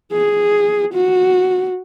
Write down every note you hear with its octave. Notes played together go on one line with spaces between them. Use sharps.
G#4
F#4